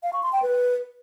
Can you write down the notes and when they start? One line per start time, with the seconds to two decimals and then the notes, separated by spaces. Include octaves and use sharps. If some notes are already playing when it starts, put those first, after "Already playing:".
0.03 F5
0.13 C#6
0.23 C6
0.33 G5
0.42 B4